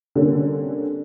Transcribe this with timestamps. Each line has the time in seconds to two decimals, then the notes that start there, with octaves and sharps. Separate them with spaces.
0.15 D3 G3 A#3 C4 C#4